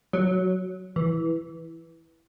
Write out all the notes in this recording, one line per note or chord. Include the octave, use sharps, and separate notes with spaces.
F#3
E3